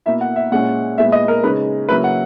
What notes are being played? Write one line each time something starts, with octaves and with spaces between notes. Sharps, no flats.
B2 A#3 E4 E5
F#5
E5
A#2 G#3 C#4 E4 F#5
A#2 G#3 B3 E4 E5
D#5
A#4
C#3 G#3 D#4 B4
C#3 F#3 A#3 E4 B4
F#5